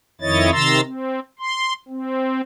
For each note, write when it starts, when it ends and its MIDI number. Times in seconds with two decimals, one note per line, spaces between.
0.21 0.51 41
0.21 0.51 51
0.21 0.51 64
0.21 0.51 73
0.21 0.51 75
0.21 0.51 93
0.52 0.81 48
0.52 0.81 51
0.52 0.81 82
0.52 0.81 84
0.52 0.81 88
0.52 0.81 93
0.83 1.20 60
1.39 1.73 84
1.89 2.41 60